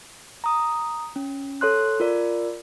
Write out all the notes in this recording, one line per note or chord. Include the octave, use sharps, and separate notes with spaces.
A#5 D#6
C#4
A4 C#5 C6 F#6
F4 A#4 D5